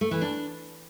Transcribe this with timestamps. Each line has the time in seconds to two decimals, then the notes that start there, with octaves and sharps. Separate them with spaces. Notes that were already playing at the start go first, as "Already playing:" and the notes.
0.01 A3
0.11 E3
0.21 D4